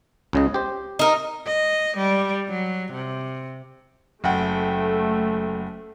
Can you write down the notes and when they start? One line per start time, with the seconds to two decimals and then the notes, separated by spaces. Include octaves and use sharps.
0.33 C#2 C#3 D#5
0.54 G4 C5
0.99 D#4 A#4
1.45 D#5
1.97 G3
2.49 F#3
2.92 C3
4.24 F#1 A3 F#5 G5